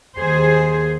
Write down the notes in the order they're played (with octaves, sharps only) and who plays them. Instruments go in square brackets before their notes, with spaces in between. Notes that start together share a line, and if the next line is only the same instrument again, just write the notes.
[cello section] D#2 G#4 C5